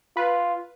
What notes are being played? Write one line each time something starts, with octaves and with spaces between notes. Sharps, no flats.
F4 B4